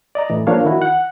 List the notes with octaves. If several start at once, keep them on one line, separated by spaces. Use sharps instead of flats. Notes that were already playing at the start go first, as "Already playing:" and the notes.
D5 D#5 A#5
A2 E3
F3 A#3 D4 C#5 F5
D#3 E4 F#4
F#5